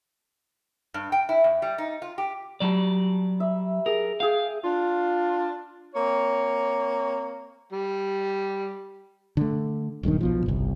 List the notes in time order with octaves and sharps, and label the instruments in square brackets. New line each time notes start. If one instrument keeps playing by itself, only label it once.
[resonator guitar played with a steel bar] G2
G5
E4
E2
G3
D#4
F4
G4
[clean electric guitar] F#3 D5 [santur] G3 A5 A#5
[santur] E5
[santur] G#4 [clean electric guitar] A#4
[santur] G#4 G5 [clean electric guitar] F5
[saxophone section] D4 F4
A#3 C4 C#5
[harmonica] G3
[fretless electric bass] D3 A3
D#1 B1 G2 D#3
B1 B2 F3
G1 C2